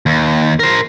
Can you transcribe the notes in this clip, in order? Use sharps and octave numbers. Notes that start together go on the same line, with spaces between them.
D#2
A#4 C5